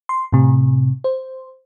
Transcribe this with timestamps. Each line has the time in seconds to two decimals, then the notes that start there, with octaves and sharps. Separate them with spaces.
0.09 C6
0.32 A2 C3
1.04 C5